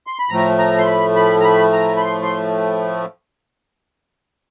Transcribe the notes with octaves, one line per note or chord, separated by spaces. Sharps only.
C6
B5
A2 F3 A3 A#5
A#5
C6
B5
B5
A#5
B5
A#5
B5
C6
C6